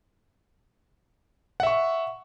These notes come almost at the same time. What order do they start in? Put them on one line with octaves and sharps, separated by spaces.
F#5 E5 C#6